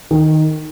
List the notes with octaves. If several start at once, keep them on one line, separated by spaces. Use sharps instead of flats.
D#3